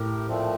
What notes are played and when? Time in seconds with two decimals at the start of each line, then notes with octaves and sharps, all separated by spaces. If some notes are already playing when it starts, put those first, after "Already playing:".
Already playing: A2 G4 A#4
0.27 A#2 F3 A3 C4